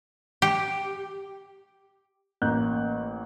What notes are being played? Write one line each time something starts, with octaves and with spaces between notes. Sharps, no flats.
G4
A1 A#3 F#6 G6